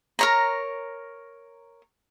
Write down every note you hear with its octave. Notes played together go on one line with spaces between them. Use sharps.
A#4 C#5 A#5